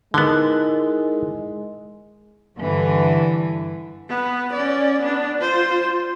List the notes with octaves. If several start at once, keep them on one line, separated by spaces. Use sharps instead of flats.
D3 G#3 B3 D#4 E4 A#4
G2 D3 E3
B3
C#4 D5
B3 D4
F4 C5